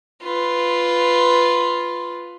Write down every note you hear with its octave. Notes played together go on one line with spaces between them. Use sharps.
F4 B4